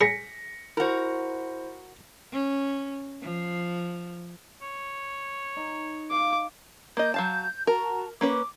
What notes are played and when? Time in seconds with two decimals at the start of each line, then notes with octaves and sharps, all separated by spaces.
0.01 G#4 A#6 B6 C#7
0.77 E4 F#4 A#4 C5
2.32 C#4
3.22 F3
4.62 C#5
5.56 D#4
6.11 F5 D6
6.97 A#3 D#5 G6
7.14 F#3 F5 A5
7.67 F#4 A#4 A5 A#5
8.21 A#3 C#4 B4 D6